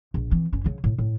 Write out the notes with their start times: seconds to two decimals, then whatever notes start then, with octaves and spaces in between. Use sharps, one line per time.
0.14 A#1
0.31 E3 C4
0.52 F#1 C#4
0.64 C#3 F#3
0.84 A2
0.98 A2